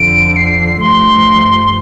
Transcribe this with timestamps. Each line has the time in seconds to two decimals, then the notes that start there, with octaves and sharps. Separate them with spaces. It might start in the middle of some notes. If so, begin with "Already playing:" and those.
Already playing: F2 D3 F3 D7
0.36 C7
0.80 G2 F3 A3 C6